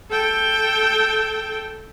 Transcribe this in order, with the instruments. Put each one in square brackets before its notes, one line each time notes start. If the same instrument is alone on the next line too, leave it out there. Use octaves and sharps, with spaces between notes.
[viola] A4 G5